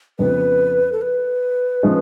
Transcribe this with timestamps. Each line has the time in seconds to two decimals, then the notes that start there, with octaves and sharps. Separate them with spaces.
0.19 F2 C#3 F3 B3 B4
0.92 A4
1.02 B4
1.83 F3 G#3 C#4